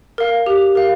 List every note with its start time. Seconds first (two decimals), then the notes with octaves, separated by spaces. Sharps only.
0.18 A#4 F5
0.46 G4
0.75 A#4 F5